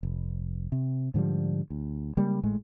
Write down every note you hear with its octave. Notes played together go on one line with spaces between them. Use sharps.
F1
C3
G#2 D3 F3 G3
D2
C#3 G3 G#3 A#3
G#1 A2 G#3 A3